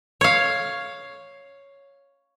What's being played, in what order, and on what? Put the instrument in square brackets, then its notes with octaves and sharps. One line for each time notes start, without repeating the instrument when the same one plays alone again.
[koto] C#5 F5